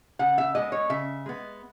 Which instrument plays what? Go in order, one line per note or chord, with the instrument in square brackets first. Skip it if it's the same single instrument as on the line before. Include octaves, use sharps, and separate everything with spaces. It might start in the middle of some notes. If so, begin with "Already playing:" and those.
[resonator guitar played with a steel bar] C#3 F#5
E5
G#3 B3 D#5
C#5
C#3 E5
G#3 B3